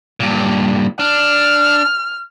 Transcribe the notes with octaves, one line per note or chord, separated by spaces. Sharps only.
G2 A#2
D4 F6